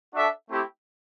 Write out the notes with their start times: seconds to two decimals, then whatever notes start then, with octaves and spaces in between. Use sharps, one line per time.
0.14 D4 F#4 A4 E5
0.49 A3 C4 E4 G4